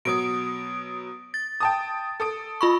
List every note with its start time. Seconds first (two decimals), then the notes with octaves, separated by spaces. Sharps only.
0.05 B2 F#3 D#6 D7
1.34 A6
1.60 G5 A5 D#6
2.20 A4 D#6 D7
2.61 F4 B5 C#6